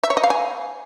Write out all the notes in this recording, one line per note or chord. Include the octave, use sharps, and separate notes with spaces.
E5
C#5
D#5
F5
G#5